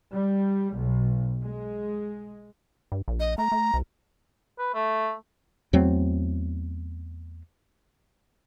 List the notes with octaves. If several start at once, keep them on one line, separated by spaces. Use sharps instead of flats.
G3
B1
G#3
G2
A#1
D#5
A3 A#5
A3
C2
B4
A3
E2 F#3 A3 C4